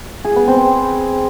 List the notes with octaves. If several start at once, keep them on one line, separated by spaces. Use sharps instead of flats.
G#4
B3
C4